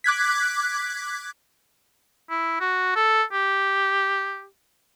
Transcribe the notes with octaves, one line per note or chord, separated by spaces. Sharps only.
D6 F#6 G#6 B6
E4
F#4
A4
G4